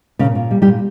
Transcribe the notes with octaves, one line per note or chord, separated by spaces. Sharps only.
A#2 C#3 C#4
A#2
G3
G3 G4
A#2